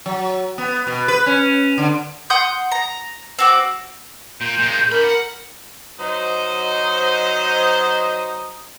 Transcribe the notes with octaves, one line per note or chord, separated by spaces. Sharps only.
F#3
B3
B2
B4
C#4
D3
F#5 C6 D#6 G6
A#5
C4 F#4 D6
A#2 G6
A#2 G#3
D3 A#4 B5
F#5
F#3 D#4 C5 D#5